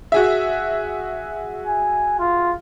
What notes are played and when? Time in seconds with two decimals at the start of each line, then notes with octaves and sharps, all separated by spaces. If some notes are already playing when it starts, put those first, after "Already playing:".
0.12 F#4 G#4 E5
1.67 G#5
2.19 F4